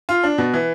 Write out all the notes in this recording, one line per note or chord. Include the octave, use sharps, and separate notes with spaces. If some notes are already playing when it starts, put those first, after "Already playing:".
F4
D4
B2
E3